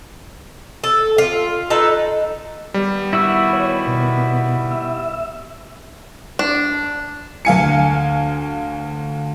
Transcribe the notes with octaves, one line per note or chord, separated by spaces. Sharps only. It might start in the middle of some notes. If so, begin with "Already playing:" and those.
A4
F4
D#4 A4 B4
D#3 G3 B3
E4 F#4 E6
C#5
B2
E5
D4
D2 F5 G#5 C#7